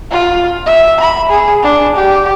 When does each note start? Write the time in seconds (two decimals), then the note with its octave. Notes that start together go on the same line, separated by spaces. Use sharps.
0.11 F4
0.66 E5
1.00 B5
1.29 G#4
1.63 D4
1.96 G4